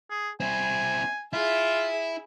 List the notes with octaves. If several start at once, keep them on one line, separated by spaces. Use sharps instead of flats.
G#4
C4 E4 G#5
E4 F4 G#4 E5